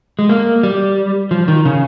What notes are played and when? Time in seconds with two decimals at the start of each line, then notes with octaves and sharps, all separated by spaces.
0.19 G#3
0.29 A#3
0.63 G3
1.31 F3
1.48 D#3
1.65 C#3